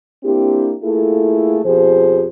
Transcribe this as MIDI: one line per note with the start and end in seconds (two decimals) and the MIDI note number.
0.24 0.74 58
0.24 0.74 60
0.24 0.74 62
0.24 0.74 64
0.24 0.74 67
0.82 1.60 57
0.82 1.60 58
0.82 1.60 64
0.82 1.60 65
0.82 1.60 68
0.82 1.60 69
1.64 2.28 41
1.64 2.28 47
1.64 2.28 53
1.64 2.28 67
1.64 2.28 68
1.64 2.28 72